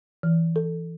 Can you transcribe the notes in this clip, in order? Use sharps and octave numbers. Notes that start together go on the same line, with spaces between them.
E3
A4